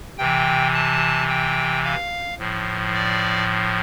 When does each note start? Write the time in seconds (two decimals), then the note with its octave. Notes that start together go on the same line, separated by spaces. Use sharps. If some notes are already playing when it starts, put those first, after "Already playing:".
0.18 C3 E3 G5
0.74 A5
1.29 G5
1.85 F5
2.39 A2 F3
2.95 D5